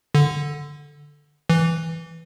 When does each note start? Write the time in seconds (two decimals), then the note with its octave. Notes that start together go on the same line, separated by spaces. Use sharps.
0.15 D3
1.50 E3